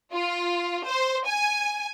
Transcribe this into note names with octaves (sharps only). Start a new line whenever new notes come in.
F4
C5
G#5